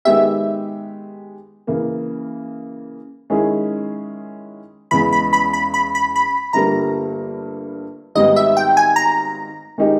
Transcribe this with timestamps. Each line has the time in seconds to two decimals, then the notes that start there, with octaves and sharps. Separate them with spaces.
0.05 D#3 G#3 B3 G4 E5
1.67 C#3 E3 A#3
3.30 D#3 G#3 C#4 E4 G#4
4.91 E2 C#3 G#3 B3 B5
5.12 B5
5.33 B5
5.53 B5
5.74 B5
5.95 B5
6.16 B5
6.53 G1 G2 G3 A#3 A#5
8.15 G#1 G#2 G3 B3 G4 D#5
8.36 E5
8.57 G5
8.77 G#5
8.96 A#5
9.78 D#3 G#3 D#4 G4